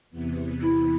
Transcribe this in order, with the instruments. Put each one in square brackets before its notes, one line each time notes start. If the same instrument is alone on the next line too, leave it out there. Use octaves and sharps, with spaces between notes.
[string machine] E2 C3 E3 B3
[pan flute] E4